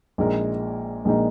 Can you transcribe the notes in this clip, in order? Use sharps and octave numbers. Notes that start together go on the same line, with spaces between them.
A#1 A#2 G#3 D#4 A#4
A#1 A#2 G#3 D#4 A#4